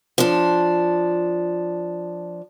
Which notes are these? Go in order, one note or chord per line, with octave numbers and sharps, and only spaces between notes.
F3 D4